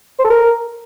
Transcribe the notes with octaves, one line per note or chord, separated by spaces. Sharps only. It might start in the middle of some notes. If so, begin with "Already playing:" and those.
C5
A4
A#4